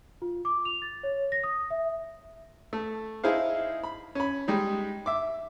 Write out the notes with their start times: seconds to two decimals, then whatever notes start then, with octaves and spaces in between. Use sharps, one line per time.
0.22 F4
0.45 D6
0.65 F7
0.82 A6
1.03 C#5
1.32 A#6
1.44 D#6
1.71 E5
2.73 A3
3.24 D#4 E4 G#4 C5 F5
3.84 B5
4.15 C#4 B5
4.48 G3 G#3 D#4
5.06 E5 D6